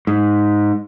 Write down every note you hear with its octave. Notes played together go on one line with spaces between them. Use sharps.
G#2